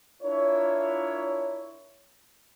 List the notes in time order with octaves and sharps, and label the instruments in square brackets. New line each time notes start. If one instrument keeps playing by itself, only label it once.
[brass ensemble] D4 E4 F4 A#4 C#5